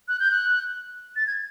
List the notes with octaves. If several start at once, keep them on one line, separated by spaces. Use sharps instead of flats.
F#6
G6
F#6
A6
G#6